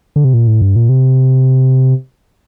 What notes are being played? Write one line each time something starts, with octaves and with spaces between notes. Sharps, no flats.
D3
C3
A#2
A2
G2
A#2
C3